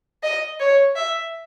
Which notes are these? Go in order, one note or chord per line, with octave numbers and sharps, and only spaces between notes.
D#5
C#5
E5